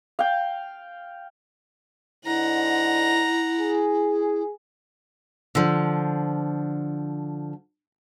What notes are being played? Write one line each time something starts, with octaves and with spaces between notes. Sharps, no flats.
F5 G5
G#2 D3 E4 F#5 A#5
G#4
D3 F3